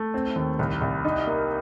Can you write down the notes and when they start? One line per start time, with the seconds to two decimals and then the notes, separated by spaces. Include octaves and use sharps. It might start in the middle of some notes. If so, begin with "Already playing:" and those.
Already playing: A3
0.14 C4
0.36 D#2
0.59 C2
0.81 C2
1.05 D#4
1.27 A#3